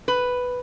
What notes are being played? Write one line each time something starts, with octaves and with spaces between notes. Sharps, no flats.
B4